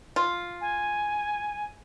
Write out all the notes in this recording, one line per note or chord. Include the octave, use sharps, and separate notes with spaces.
F4
G#5